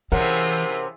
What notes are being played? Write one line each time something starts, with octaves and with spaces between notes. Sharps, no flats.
C3 E3 C#4 E4 F4 G#4 A#4 F#5